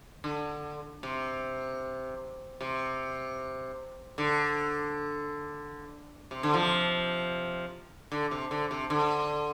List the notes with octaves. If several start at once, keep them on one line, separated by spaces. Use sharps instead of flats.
D3
C3
C3
D3
C3
D3
C3 F3
D3
C3
D3
C3
D3